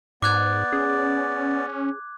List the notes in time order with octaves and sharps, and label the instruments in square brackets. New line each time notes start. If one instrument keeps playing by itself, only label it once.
[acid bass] G#2 [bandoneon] B3 D5 [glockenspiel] D6 F#6 G#6
[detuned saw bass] C#4 [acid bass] G#4